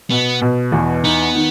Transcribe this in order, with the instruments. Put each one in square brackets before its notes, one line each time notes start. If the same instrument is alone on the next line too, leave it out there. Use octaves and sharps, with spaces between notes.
[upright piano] B2 [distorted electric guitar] B3
[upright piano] B2
E2
[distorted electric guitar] B3 [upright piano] D#4
[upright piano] D#3